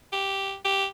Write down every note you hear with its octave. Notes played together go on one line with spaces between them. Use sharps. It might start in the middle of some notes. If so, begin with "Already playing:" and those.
G4
G4